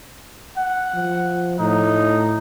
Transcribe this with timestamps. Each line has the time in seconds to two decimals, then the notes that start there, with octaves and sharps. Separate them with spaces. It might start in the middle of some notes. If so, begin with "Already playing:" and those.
0.57 F#5
0.94 F3
1.59 A2 D#4